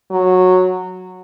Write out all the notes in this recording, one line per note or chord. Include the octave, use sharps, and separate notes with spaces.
F#3